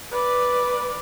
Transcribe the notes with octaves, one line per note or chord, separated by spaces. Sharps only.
B4 D5